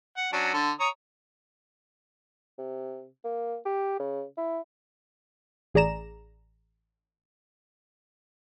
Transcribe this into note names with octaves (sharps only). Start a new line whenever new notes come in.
F#5
F#3 C#4 D4
D3 A4
C#5 A#5 D#6
C3
A#3
G4
C#3
E4
A1 G#4 D5 A#5 E7